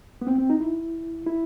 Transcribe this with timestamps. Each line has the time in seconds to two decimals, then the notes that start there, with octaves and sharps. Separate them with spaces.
0.21 B3
0.27 C4
0.38 C4
0.50 D#4
0.60 E4
1.26 E4